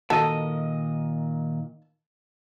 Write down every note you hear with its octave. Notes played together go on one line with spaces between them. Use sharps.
A#2 D#3 F#4 A4 D#5